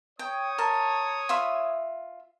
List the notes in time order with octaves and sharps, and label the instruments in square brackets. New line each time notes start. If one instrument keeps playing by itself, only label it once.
[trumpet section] C#5 D#6 [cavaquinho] G5
[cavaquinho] A#4 A5
F4 E5 B5